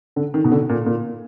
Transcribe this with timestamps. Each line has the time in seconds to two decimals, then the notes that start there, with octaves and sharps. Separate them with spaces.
0.16 D3
0.34 D#3
0.44 B2
0.52 D3
0.69 A#2
0.86 A#2